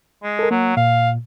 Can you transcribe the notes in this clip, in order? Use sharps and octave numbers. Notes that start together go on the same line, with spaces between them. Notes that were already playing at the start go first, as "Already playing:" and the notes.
G#3
A4 A#4
F#3 A#3
A#2 F5